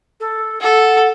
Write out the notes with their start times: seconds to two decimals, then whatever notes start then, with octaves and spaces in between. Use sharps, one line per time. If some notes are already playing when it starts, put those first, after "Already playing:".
0.20 A4
0.61 A4 F#5